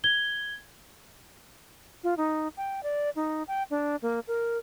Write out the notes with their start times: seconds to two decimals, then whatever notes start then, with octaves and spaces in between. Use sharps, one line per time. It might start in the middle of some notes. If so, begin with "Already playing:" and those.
0.04 G#6 G7
2.04 F4
2.17 D#4
2.57 G5
2.83 D5
3.16 D#4
3.48 G5
3.70 D4
4.02 A#3
4.28 A#4